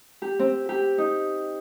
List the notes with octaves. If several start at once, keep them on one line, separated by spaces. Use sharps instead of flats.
G4
C4
G4
D#4